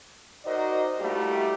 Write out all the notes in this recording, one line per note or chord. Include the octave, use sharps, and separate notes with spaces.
D#4 F#4 A#4 C5 D5 D#5
G3 A3 A#3 E4 F#4 G4